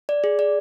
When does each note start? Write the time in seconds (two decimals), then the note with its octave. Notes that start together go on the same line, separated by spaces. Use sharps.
0.09 D5
0.24 G#4
0.39 D5